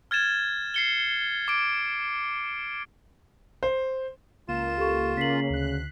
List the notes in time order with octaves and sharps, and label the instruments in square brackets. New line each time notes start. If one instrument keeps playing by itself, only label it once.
[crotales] F6 G#6 A6 E7
C7 C#7 G7
D6 D7
[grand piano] C5
[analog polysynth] C#2 A#3 E7 [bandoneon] F4
[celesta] G4 A4 C#6
[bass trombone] C#3 [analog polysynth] A#3 C#4 [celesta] B6 C7 F#7
[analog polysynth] D2 F#6